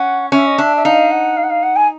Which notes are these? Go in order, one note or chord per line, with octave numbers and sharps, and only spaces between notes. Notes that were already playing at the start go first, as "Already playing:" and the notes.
Already playing: C#4 F#5
C#4 E5
D#5
D4 E5
E5
D#4 F5
F#5
F5
F#5
F5
F#5
G#5